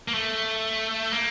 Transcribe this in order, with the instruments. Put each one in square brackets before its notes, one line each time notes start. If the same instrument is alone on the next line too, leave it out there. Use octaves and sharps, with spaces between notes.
[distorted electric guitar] A#3
A3
A#3